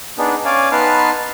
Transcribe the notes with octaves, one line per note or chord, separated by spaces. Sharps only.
B3 D4 D#4 G#4
C#4 D5 F5 G#5
B3 D#4 B4 A5 C6 F6